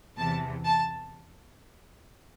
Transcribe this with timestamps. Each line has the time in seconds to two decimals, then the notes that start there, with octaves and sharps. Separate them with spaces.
0.17 E2 C3 E3 A5
0.65 A5